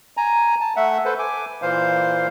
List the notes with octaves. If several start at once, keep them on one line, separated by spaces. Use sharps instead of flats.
G#5 A#5
A5
A3 E5 F#5
A4 B4 C5
G#5 D6
A#2 E3 C5 F5